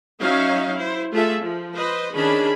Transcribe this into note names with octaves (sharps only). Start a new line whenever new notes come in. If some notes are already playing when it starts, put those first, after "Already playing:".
F#3 C#4 D#4 E5 F5
E4 C5
A3 F4 G#4 A4 E5
F3
B4 C5 D#5
D#3 C#4 D4 G#4 B5